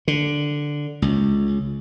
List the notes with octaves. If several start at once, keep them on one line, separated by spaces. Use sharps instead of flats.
D3
C#2